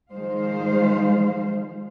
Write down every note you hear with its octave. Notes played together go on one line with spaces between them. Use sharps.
D#3 F3 G#3 C5 F5